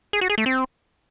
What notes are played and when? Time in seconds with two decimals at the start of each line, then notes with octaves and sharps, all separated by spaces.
0.13 G#4
0.21 F#4
0.30 G#4
0.38 A3
0.46 C4